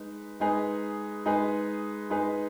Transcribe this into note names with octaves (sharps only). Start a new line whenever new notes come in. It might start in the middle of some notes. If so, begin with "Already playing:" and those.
Already playing: G#3 D#4 B4
G#3 D#4 G#4 B4
G#3 D#4 G#4 B4
G#3 D#4 G#4 B4